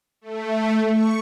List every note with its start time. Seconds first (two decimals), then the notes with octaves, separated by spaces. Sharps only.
0.21 A3
0.87 C#6